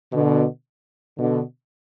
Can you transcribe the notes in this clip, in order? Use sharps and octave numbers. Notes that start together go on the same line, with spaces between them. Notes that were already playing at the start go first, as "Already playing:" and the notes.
B2 D3
B2 D3